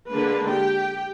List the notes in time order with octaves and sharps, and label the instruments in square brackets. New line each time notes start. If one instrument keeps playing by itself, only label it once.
[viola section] D3 G#3 A#3 D4 B4
G4 G5